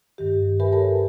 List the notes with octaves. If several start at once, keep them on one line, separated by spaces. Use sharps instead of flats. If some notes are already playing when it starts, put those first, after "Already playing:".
G2 D#3 G4
G4 A#4 B4 E5 G#5 B5
A4 A#4 C#5 A5